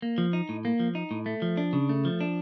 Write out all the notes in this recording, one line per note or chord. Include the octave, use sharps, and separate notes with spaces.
A#3
F3
D#4
A2
A#3
F3
D#4
A2
A3
F3
D4
C#3
A3
F3
D4